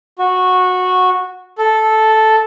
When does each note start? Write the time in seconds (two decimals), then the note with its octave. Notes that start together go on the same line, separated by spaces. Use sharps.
0.19 F#4
1.58 A4